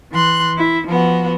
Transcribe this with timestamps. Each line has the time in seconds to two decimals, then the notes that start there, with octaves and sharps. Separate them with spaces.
0.13 E3 C6 F#6
0.58 E4
0.87 F3 B3 F#4